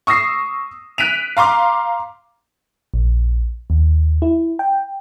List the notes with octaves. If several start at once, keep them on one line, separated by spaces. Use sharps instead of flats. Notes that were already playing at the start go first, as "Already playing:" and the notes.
C#6 D#6 E6 A#6 C7
F#6 B6 D7 D#7 F7
F5 A#5 C6 D6
A#1
D#2
E4
G5